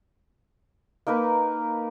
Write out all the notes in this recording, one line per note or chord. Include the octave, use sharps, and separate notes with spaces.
A#3 D#4 A#4 B4